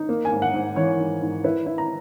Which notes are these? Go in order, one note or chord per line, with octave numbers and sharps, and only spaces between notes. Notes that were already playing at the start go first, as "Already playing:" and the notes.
Already playing: D#4
A#3
G#5
G#2
F#5
G#2
E3 C#5
G#2
G#2
E4 B4
E4
A#5